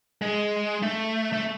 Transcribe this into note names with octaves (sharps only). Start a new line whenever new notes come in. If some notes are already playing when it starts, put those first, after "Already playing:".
G#3
A3
A3